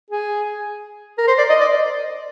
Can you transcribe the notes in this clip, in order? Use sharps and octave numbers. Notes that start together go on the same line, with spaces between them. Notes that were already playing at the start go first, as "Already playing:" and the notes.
G#4
A#4
C5
D5
D#5
D5